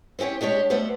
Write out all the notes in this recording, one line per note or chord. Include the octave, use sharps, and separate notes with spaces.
C4 C#4 F#4 G4 C#5
G#3 D4 G4 C#5
G3 A3 B3 F#4 C5 D5